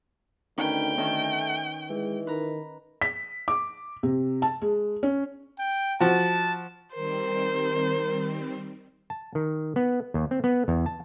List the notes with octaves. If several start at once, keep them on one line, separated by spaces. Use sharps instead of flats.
D2 D#3 C#4 B4 G5
D#3 A3 C#4 D#4
E3 G#3
D#3 B4 A#5
B6
D6
C3
A5
G#3
C#4
G5
F3 F#4 A5
D#3 G3 C4 A#4 C5
A5
D#3
B3
D#2
C4
B3
E2
A5